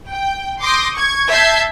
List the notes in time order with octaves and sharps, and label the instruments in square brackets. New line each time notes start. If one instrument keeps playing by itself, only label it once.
[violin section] G5
C6 D6 D#6 G6 A#6 D7
C#6 G#6
E5 A5 G6 G#6 C7